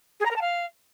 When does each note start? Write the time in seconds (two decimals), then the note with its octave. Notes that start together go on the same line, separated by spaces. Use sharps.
0.20 G#4
0.25 A#5
0.31 A#4
0.36 A5
0.41 F5